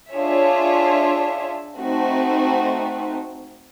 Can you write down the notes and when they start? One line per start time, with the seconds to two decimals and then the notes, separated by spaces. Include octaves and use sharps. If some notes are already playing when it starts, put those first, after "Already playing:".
0.12 D4 F4 G#4 C#5 E5
1.78 A3 C4 D#4 F#4